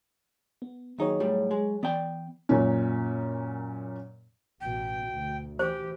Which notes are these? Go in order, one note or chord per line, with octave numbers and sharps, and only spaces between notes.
B3
D#2 F#3 D#4 G#4 C#5
A2 G3
G#3
E3 B3 D5 G5
F#2 A#2 C#4
A1 B2 G5
D2
E3 G4 C5